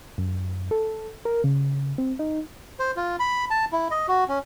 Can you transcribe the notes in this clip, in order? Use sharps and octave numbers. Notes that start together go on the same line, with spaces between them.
F#2
A4
A#4
C#3
C4
D#4
C5
F4
B5
A5
E4
D#5
F#4
C#4